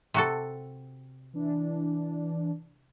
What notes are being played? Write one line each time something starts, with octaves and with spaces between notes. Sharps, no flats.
C3 F#4 A4
E3 D4